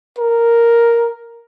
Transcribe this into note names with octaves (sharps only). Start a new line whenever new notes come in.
A#4